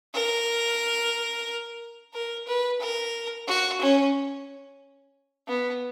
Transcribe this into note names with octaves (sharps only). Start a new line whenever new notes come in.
A#4
A#4
B4
A#4
F#4
C#4
B3